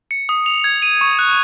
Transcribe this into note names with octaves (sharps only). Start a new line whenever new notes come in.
C#7
D#6
F7
G#6
D#7
C#6
F#6